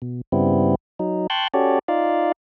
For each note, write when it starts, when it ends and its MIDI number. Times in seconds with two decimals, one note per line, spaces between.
0.02 0.21 47
0.32 0.75 43
0.32 0.75 49
0.32 0.75 55
0.32 0.75 59
0.32 0.75 60
0.32 0.75 64
0.99 1.27 54
0.99 1.27 63
1.30 1.48 79
1.30 1.48 81
1.30 1.48 84
1.30 1.48 85
1.30 1.48 90
1.30 1.48 91
1.54 1.79 61
1.54 1.79 66
1.54 1.79 67
1.54 1.79 69
1.54 1.79 73
1.54 1.79 74
1.88 2.32 63
1.88 2.32 65
1.88 2.32 74
1.88 2.32 77